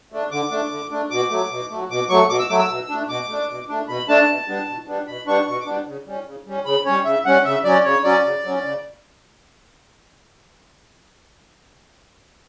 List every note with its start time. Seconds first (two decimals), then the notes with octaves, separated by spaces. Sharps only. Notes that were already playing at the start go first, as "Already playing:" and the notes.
0.12 A3 D4
0.31 D3 D6
0.51 A3 D4
0.71 D3
0.91 A3 D4
1.11 B2 D6
1.30 F#3 A3
1.51 B2
1.70 F#3 A3
1.90 B2 D6
2.09 F#3 A3 C#6
2.30 B2 D6
2.39 E6
2.49 F#3 A3 D6
2.59 E6
2.70 B2
2.89 A3 D4
3.09 B2 D6
3.29 A3 D4
3.49 B2
3.69 A3 D4
3.88 B2 B5
4.08 A3 D4 A5
4.28 B2
4.48 G3 B3 D4
4.67 B2
4.87 G3 B3 D4
5.07 B2 B5
5.27 G3 B3 D4 C#6
5.47 B2 C#6
5.60 D6
5.66 G3 B3 D4
5.87 C#3
6.06 G3 C#4
6.26 C#3
6.46 G3 C#4
6.65 C#3 B5
6.85 G3 C#4 C#5
7.05 C#3 E5
7.25 G3 C#4 F#5
7.45 C#3 E5
7.64 F#3 C#4 D5
7.84 C#3 C#5
8.04 F#3 C#4 D5
8.24 C#3
8.44 F#3 C#4
8.64 C#3